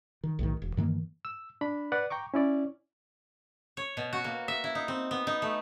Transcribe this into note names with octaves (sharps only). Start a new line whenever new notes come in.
D#3
B1 A2 D#3
E1
G2 D#3 E3 A#3
E6
D4 B5
B4 D5 F#5
G5 A#5 C#6 D6
C#4 E4 D5
C#5
B2
F#4
A#3
E5
E4
D#4
C4
B3
D#4
A3